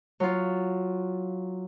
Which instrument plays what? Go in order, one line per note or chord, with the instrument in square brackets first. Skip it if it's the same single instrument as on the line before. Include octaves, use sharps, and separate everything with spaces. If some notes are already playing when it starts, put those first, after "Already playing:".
[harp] F#3 F4